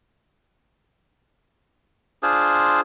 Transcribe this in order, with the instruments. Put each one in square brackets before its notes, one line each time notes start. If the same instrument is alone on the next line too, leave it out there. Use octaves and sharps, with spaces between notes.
[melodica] D4 F4 G#4 C5